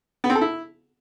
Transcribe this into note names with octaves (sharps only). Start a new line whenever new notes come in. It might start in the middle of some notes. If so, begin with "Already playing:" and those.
B3
C4
A4
E4